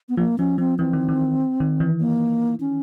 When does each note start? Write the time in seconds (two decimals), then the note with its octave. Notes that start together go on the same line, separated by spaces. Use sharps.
0.09 B3
0.17 F3 A#3
0.38 F3 C#4
0.58 F3 C4
0.79 E3 C4
0.93 D#3
1.09 D#3
1.60 D#3
1.80 E3
2.00 A#3
2.60 C#4